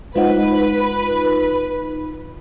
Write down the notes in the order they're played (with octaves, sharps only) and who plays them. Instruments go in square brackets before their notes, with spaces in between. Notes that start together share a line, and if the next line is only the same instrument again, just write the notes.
[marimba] G#3 C5 F#5 [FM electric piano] D#4 F4 [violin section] B4